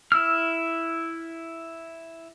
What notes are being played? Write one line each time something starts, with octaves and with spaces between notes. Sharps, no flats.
E4 E6 F6